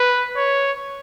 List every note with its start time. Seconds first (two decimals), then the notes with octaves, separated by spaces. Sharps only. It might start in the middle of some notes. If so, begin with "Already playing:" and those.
Already playing: B4
0.37 C#5